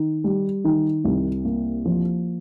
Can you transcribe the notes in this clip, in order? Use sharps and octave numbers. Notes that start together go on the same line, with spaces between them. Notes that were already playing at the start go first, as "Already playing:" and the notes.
Already playing: D#3
G3
D#3
C2
A#3
F3